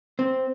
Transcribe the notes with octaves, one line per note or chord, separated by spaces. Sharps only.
C4